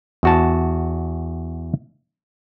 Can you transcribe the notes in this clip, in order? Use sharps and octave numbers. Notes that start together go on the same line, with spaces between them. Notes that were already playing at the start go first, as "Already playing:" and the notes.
E2 F#4 A5